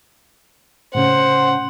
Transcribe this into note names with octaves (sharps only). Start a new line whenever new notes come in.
A2 C#3 C#4 C5 F#5